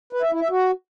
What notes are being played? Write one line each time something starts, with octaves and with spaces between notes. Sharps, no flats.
B4
E5
E4
E5
F#4